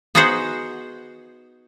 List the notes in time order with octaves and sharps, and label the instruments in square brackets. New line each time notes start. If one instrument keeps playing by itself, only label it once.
[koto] B3 D#4 F#4 G#4 C5 F#5